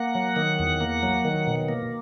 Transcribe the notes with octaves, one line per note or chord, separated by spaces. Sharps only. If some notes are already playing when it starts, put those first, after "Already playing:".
Already playing: A#3 F#5
F#3
D#3
E2
A#3
F#3
D#3
B2
A#3